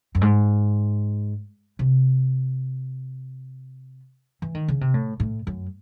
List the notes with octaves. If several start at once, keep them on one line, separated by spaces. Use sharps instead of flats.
F#2
G#2
C3
E3
D#3
C#3
C3
A2
A2
F#2